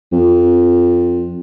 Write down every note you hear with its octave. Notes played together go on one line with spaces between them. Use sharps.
F2